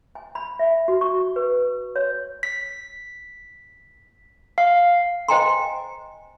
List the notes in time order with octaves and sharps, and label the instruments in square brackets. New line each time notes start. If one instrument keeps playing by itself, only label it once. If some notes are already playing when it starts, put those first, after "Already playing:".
[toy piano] G#5
B5
E5
F#4
C#6
B4
C#5
[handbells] B6
F5
[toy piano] C5 D#5 G5 G#5 A#5 C6